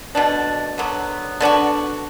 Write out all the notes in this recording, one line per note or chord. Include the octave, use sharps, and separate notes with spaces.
B2 A3 D4
D3 F#3 B3
D3 B3 D4 F#4